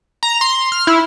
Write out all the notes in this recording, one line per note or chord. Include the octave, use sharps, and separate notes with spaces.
A#5
C6
F6
E4